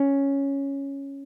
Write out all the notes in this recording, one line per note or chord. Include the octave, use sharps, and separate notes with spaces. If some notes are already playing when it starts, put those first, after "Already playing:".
Already playing: C#4